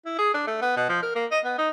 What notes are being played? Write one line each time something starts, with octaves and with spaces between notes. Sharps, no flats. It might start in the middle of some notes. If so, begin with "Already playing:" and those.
E4
G#4
D4
A3
B3
B2
F3
A#4
A#3
D#5
B3
D#4